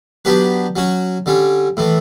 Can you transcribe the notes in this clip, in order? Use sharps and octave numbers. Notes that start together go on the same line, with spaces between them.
F#3 B3 D4 G4 B4
F#3 C#4 F#4
D3 G3 C#4
A2 E3 A3